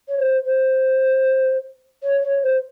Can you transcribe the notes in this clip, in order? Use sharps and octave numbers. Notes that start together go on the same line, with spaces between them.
C#5
C5
C5
C#5
C#5
C5